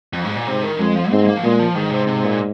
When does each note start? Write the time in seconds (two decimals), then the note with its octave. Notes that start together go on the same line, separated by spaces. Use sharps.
0.13 F2
0.24 G#2
0.36 A#2
0.47 G#2 C3
0.64 D#3
0.79 F2 G#3
0.96 F3
1.11 G#2 C4
1.22 G#3
1.27 A#3
1.37 F3
1.43 A#2 G#3
1.59 F3
1.75 G#2 D#3
1.91 C3
2.07 C3
2.24 A#2